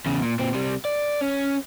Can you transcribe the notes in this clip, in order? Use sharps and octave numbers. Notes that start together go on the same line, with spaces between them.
E2 C#3
A#2
A#2 C4
C3 G3
D5
C#4